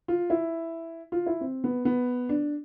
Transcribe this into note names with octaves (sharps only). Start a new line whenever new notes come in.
F4
E4
F4
E4
C4
B3
B3
D4